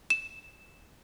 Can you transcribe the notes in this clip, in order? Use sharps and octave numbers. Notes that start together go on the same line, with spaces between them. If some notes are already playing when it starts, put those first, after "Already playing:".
E7